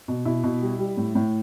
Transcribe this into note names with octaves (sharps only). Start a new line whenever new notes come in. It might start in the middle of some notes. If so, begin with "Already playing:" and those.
B2
B2 E4
B2
G3
G3
A2
A2